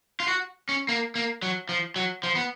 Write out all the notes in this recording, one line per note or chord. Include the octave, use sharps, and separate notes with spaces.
F4
F#4
C#4
A#3
A#3
F#3
F3
F#3
F3
B3